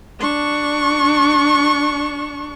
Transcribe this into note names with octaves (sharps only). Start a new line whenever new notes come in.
D4 C#6